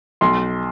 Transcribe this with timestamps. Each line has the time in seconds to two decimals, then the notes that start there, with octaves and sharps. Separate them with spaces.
0.21 B1 C6